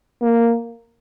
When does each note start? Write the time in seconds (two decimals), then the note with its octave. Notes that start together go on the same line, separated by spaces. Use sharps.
0.22 A#3